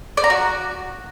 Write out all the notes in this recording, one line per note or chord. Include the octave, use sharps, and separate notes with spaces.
D5
A#5
F#4